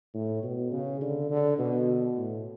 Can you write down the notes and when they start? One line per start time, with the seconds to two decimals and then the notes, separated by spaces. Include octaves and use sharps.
0.14 A2
0.43 B2
0.72 C#3
1.01 D3
1.30 D3
1.59 B2
2.17 A2